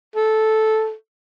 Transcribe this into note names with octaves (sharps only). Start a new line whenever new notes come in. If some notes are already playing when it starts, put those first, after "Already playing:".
A4